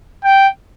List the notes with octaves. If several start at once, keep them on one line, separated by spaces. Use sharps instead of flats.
G5